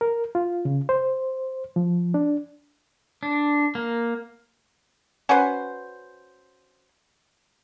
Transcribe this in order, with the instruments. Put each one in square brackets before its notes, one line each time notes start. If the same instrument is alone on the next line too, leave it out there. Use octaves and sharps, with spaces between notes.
[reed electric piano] A#4
F4
C#3
C5
F3
D4
[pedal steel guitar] D4
A#3
[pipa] C#4 F#4 B4 C5